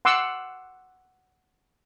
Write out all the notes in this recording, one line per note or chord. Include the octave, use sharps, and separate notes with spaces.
F#5 C6 D6 E6